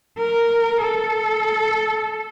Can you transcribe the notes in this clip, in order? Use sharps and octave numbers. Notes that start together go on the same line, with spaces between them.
A#4
A4